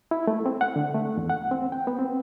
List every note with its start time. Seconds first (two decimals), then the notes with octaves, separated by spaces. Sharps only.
0.11 E4
0.27 A3
0.46 C4
0.61 F#5
0.76 D3
0.94 A3
1.17 E2
1.30 F#5
1.51 C4
1.72 G5
1.87 B3
1.99 C4